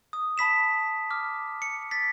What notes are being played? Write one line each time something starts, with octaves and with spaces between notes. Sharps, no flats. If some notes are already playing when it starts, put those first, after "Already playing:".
D#6
A5 B5 B6 E7
D6 F6
C#7
A6 B6